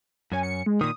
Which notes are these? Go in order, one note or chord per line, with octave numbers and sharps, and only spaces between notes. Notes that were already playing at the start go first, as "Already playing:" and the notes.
F#2 C#4 G#5
C#7
G#3
A#2 D#3 D#6